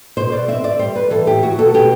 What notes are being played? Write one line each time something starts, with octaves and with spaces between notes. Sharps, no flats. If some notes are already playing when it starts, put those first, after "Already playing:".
B2 C5
B2 D5
C4 E5
C4 D5
G3 C5
G3 B4
E3 A4
A2 G4
F#3 F#4
B2 A4
B2 G4